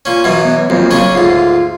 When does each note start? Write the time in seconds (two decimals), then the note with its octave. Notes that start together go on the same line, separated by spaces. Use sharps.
0.05 A#2 C#4
0.24 F#2 B2 E3
0.45 B3
0.70 F2 F#3 A#3 C4
0.91 C#3 C#4 D4
1.15 D2 G#2 F4